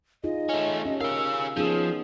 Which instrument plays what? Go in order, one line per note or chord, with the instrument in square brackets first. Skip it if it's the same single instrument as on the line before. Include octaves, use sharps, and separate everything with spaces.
[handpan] D#4 F4 G#4 [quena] D#5
[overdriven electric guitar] A3 C#4
[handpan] C#4 G4
[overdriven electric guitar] G#4 F5 [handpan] A#4 [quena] E6
[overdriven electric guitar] F3 [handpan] B3 C#4 D#4 [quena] G#4